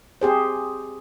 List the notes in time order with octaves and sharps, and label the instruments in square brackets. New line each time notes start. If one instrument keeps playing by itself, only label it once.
[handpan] C4 G4 G#4 C5